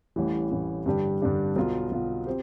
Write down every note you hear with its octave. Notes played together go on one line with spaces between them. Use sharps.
A1 A2 E3 G3
A1 A2 E3 G3
G2 D3 G3 D4 G4
G2 D3 G3 D4 G4
B1 B2 B3 F4
B1 B2 B3 F4
C4 G4 C5